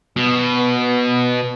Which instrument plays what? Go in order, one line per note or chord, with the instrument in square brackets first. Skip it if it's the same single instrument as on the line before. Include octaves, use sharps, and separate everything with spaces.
[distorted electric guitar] B2 [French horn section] B3
[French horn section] B3